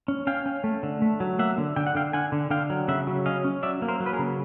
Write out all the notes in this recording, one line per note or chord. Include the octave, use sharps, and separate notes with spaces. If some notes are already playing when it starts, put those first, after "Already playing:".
C#4
C#4 F5 G5
C#4
A3
D3
A3
F#3
A#3 E5 F#5
D3
D3 G5
F#5
D3 F5 G5
D3 F#5 G#5
D3
D3 F5 G5
F#3
C#3 E5 F#5
F#3
C#4 D#5 F5
C#4
F#3 D5 E5
A#3
A#4 C5
F#3
B4
G#4 A#4
C#3